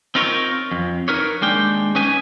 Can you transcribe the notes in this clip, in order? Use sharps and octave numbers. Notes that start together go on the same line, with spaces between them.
C4 D#4 F4 A#4 C5 C#5
F2
D#4 A#4 B4 C#5
D#2 G#3 D4 G5
C#4 D#4 B4 G#5